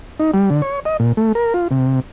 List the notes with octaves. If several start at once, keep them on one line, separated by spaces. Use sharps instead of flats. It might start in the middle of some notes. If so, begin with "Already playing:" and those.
D#4
G3
D3
C#5
D#5
A#2
A3
A#4
F4
C3